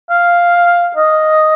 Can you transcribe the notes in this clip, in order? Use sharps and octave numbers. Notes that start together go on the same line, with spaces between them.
F5
D#5